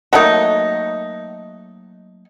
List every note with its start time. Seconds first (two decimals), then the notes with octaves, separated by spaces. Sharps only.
0.13 F#3 A3 A#3 D#4